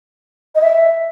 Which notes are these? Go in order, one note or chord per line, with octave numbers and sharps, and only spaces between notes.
D#5
E5